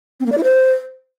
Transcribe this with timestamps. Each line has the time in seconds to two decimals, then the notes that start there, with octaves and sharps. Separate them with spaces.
0.20 C4
0.26 A#3
0.32 D5
0.38 E4
0.44 C5